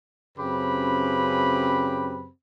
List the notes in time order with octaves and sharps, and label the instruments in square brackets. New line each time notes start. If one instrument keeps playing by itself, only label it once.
[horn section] F#2 C#3 C4 G4 B4 B5